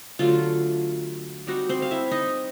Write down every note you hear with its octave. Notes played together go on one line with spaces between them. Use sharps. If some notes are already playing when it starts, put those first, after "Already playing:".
D3 F#3 A3 F4
G3 C4 D#4 F#4
C4 C5
F5
E4 E5
D#4 D#5